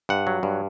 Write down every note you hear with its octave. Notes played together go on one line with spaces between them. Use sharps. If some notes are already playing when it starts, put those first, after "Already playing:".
G2 F#5
F#3
G2